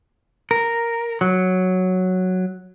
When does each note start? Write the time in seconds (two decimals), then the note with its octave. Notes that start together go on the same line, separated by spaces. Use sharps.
0.51 A#4
1.21 F#3